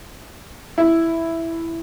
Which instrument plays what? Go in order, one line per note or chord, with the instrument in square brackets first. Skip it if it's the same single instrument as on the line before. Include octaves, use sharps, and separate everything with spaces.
[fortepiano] E4